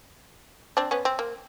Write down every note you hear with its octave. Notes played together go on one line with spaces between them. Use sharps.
C4 D4
B3 C#4
C4
A#3